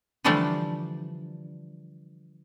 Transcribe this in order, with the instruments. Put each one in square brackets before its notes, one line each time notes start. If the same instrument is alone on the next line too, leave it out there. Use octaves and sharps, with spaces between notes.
[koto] D3 E3 F3 G3 A3 D4